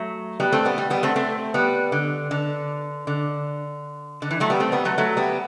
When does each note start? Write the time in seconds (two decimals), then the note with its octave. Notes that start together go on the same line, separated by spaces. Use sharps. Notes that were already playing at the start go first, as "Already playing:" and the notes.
Already playing: F#3 A3
0.40 G3 B3
0.52 A3 C4
0.65 G3 B3
0.78 G3
0.90 G3 B3
1.03 A3 C4
1.16 A3 C4
1.54 G3 B3
1.92 D3
2.31 D3
3.07 D3
4.22 D3
4.31 E3
4.40 F#3 A3
4.50 G3 B3
4.60 A3 C4
4.72 G3 B3
4.85 F#3 A3
4.98 F#3 A3
5.17 G3 B3